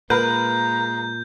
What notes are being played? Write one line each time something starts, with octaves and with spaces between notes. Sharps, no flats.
A#2 G#3 A#3 A#4 B4 A#5 G6